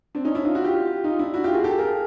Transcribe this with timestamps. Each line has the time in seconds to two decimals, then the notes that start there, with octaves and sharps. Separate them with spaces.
0.15 C4 D4
0.25 C#4 D#4
0.35 D4 E4
0.45 D#4 F4
0.54 E4 F#4
0.64 F4 G4
1.04 D#4 F4
1.19 D4 E4
1.34 E4 F#4
1.44 F4 G4
1.54 F#4 G#4
1.64 G4 A4
1.78 G#4 A#4